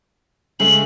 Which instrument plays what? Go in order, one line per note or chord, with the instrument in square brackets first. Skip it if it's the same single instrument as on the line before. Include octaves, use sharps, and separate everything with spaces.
[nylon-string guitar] C#3 G#3 A3 [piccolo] F#7